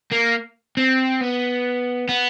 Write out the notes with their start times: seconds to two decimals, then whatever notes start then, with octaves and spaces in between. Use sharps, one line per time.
0.12 A#3
0.77 C4
1.21 B3
2.09 B3